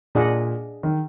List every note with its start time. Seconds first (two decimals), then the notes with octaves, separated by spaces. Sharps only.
0.15 A#2 D4 G#4 D#5 F#5
0.83 D#3